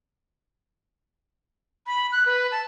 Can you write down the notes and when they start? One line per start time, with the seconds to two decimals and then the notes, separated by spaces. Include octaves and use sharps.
1.87 B5
2.12 F#6
2.26 B4
2.51 A5